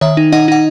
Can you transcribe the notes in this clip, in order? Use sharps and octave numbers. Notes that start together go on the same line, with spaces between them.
D#3 C#5 E5
D#4
D#4 D#5 F#5
D#4 F#5